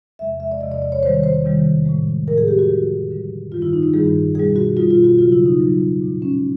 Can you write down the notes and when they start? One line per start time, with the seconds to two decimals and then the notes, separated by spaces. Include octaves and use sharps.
0.19 E2 C3 F3 G#3 E5
0.40 E5
0.52 D5
0.61 E2 C3 F3 G#3 D#5
0.71 D5
0.82 D5
0.92 C#5
1.03 F2 C3 D#3 G3 C5
1.24 C5
1.44 F2 C3 D#3 G3
1.86 A2 F3 G#3
2.27 A2 F3 G#3 A#4
2.38 G#4
2.48 G4
2.59 F#4
2.69 F2 D3 G3
3.10 F2 D3 G3
3.52 G2 D#3 G3 F4
3.62 E4
3.73 D#4
3.83 E4
3.94 G2 D#3 G3 G#4
4.35 B2 G3 G#4
4.56 F#4
4.77 B2 G3 F4
4.91 F4
5.04 F#4
5.18 F2 C#3 F#3 F4
5.32 E4
5.46 D#4
5.60 F2 C#3 F#3
6.01 A#2 F3 G#3
6.22 C#4